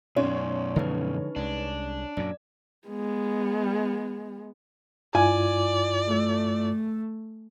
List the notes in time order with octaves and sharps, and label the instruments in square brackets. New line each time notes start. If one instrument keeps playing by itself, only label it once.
[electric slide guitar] F#2 B2 [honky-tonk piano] C#4 [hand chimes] D#4 D5 C6
[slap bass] D3 F3 G#3 [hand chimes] D#4 B4
[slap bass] C2 G#3 [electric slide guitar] D4
[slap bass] F#2 A#2 F#3 [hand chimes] D5
[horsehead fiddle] G#3 B3
[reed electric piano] G2 E4 F4 [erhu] D5 [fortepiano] G#5
[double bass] A3